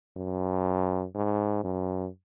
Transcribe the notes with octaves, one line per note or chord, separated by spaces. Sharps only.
F#2
G#2
F#2